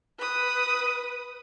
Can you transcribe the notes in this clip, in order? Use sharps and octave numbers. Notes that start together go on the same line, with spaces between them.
B4 D#6